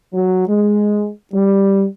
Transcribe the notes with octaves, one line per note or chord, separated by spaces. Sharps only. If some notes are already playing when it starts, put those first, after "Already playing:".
F#3
G#3
G3